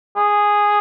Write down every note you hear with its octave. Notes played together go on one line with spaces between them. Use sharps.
G#4